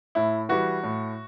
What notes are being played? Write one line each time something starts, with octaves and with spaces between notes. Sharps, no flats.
A2 E4
E3 G3 F#4
A2